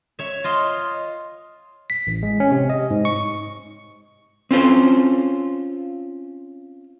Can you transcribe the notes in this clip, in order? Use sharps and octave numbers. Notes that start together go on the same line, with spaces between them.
C#5 E5
F4 D#5 C6
B6
A1
G#3
C#4
C3
D#5
G#2
C#6
C4 C#4 F4 C5